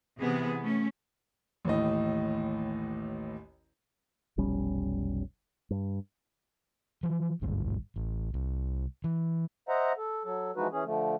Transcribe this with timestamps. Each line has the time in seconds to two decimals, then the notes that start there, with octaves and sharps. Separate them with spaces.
0.18 C3 E3 B3 G#4
0.60 A3 C#4
1.65 A1 D#2 A2 D#5
4.37 F1 B1 G3 C#4
5.71 G2
7.03 E3 F3
7.41 G#1 D2 G2
7.96 A1
8.34 C2
9.04 E3
9.69 C5 D#5 E5 F#5 A#5
9.97 A4
10.25 F#3 A4
10.56 E3 F3 G#3 D#4 F#4 B4
10.71 E3 C#4 G#4
10.84 D3 F3 A3